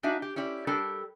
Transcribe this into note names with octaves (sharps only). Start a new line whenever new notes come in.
A#3 D4 D#4 F#4 E5 G#5
G4
C#4 E4 G4 D5
G3 D4 G4 A4 A#4